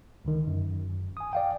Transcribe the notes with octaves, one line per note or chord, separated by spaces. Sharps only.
C#2 D3 D#3
F#2
G#5 D#6
D5 F5 G5